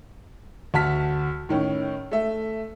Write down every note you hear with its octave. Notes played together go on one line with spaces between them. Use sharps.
D2 F#4 A5 F6 B6
A2 D#3 C#4
A3 E5